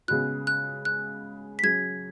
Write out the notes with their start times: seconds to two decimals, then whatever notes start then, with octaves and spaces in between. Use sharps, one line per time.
0.08 C#3 G#3 B3 F#4 F#6
0.47 F#6
0.85 F#6
1.59 B6
1.63 F#3 C#4 G#4 G#6